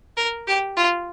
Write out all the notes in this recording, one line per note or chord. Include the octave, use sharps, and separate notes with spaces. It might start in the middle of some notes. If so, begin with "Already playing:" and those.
A#4
G4
F4